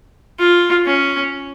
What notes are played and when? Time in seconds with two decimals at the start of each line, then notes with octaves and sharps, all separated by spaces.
0.39 F4
0.86 C#4